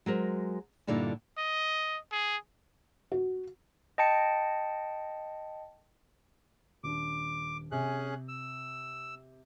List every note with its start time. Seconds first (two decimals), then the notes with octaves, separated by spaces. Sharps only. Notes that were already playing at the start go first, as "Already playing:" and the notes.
0.06 F#3 G#3 A#4 C5
0.87 G2 A#2 D3 D#4 E4
1.38 D#5
2.12 G#4
3.12 F#4
3.98 D#5 G5 A5 C#7
6.84 D#1 D4 D6
7.72 C3 C#4 G#4 F#6
8.28 E6